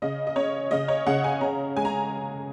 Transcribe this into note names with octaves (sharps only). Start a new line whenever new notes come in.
C#3 D#5
D#5
C#4 C#5
C#3 D#5
C#5
C#3 F#5
G#5
C#4 A#5
G#3 G#5
A#5